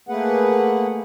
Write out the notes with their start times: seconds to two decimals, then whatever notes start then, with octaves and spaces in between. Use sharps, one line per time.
0.09 A3 A#3 G#4 B4 F#5